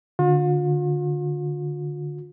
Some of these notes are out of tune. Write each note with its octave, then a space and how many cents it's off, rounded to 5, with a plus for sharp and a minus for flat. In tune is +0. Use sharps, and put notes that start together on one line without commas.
D3 +5 F4 +45